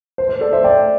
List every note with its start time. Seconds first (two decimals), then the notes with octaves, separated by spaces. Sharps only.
0.18 C5
0.29 C5
0.41 A4 D5
0.53 C5 E5
0.64 D5 G5